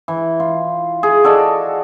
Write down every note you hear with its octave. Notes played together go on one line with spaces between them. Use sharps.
E3
F4
G#4
F#4 A4 D5 D#5